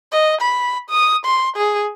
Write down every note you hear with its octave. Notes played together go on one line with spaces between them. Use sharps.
D#5
B5
D#6
C6
G#4